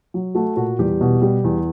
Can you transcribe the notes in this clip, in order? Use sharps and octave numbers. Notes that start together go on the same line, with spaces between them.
F#3
A3 F#4
A#2 F#4
E2 G3 G4
B2
G3
E2